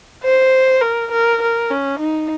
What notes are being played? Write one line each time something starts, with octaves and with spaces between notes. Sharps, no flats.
C5
A#4
A#4
A#4
C#4
D#4